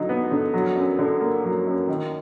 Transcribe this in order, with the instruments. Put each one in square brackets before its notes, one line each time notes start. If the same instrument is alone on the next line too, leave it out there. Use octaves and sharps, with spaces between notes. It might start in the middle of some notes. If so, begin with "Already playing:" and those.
Already playing: [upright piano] D3 F#3 D#4
B3
D3
F#3
F#2
D3
A#3
F#3
F#2
D#3